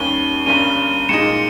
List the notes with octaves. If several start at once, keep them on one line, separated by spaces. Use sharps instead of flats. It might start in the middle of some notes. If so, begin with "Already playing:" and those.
Already playing: D#2 D#3 G3 C#4 D#7 G7
G1 G2 G3 A#3 C#4 D#7 G7
A#2 G#3 D#4 C#7 E7